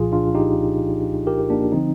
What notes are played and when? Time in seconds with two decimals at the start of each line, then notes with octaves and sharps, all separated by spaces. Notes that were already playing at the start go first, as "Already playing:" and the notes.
Already playing: C2 A#2 F3 F4 G#4
0.12 D4 F4
0.35 D#4 G4
1.27 G4 A#4
1.50 A#3 D4
1.72 D3 F3 C4 D#4